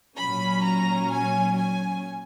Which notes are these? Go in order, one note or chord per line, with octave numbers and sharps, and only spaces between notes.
A#2 F#3 C#4 B5
A#5
G#5
G#5